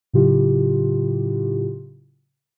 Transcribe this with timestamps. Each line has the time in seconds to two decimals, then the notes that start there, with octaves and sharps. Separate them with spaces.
0.13 A2 C#3 F#3 E4 F4 G4